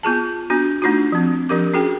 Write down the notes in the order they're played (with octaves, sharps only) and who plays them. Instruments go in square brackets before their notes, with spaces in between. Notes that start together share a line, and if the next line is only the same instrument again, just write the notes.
[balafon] B3 F4 G#4 A5
B3 D4 F#4
A3 D4 D#4 F4 F#4
F3 C4
F3 D4 G4 A#4 D6
C#4 F#4 G#4 G5